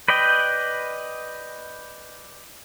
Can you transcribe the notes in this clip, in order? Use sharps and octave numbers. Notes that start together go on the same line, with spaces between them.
B4 D5 D#5 G5